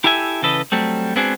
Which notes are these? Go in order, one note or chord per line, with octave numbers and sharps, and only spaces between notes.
E4 G4 A4 E5 G#5
C#3 E3 A4 B4 D#5
F#3 G3 A3 C4
G#3 B3 C4 D4 F#4 G#4